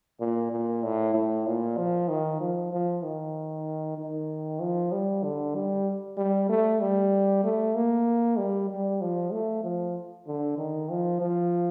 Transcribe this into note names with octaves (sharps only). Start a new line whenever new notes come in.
A#2
A#2
A2
A2
A#2
F3
D#3
F3
F3
D#3
D#3
F3
G3
D3
G3
G3
A3
G3
A3
A#3
G3
G3
F3
A3
F3
D3
D#3
F3
F3